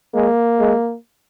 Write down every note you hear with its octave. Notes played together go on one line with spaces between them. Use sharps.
G#3 A#3
G#3